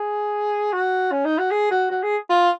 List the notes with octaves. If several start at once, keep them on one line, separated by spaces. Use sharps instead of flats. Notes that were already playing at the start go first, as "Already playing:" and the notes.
Already playing: G#4
F#4
C#4
D#4
F#4
G#4
F#4
F#4
G#4
F4